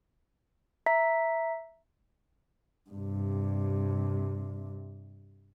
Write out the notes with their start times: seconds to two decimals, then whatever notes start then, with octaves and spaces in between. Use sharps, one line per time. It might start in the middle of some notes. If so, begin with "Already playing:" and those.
0.86 E5 A#5 B6
2.90 G2 C3